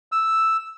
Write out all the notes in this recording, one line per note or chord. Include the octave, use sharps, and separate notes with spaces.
E6